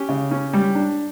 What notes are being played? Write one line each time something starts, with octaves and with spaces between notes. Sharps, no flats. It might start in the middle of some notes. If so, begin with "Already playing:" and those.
Already playing: C#4 G4
C#3
C#4
G3
D4